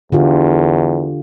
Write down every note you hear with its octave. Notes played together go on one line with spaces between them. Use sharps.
E2 D3 F4 G4